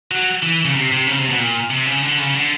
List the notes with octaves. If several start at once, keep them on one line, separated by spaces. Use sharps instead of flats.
F#3
E3
C#3
C3
C3
C#3
C3
B2
A#2
C3
C#3
D3
C#3
D3